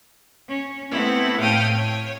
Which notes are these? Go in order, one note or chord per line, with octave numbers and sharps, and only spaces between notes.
C#4
A3 B3 C4 E4
A2 A3 F5 G5 D#6 F6
C#5